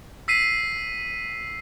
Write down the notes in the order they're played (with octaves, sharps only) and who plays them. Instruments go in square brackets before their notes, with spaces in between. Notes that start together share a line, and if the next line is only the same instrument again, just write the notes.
[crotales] E6 B6 C7 D#7